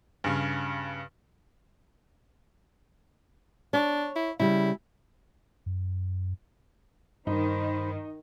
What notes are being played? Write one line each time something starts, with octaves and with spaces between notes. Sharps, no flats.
G2 C#3
D4 C#5
E4
C#3 G3 E4
F#2
G2 D#3 D#4 C5 B5